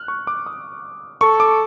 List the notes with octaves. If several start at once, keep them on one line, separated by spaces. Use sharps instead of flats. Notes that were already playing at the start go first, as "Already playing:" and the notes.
Already playing: F6 F#6
C#6
D6
D#6
A4 C#6
D6